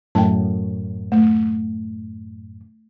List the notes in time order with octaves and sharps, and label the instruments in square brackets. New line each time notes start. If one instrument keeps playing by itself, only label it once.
[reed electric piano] F#2 A2 [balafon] G5 A5
[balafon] A3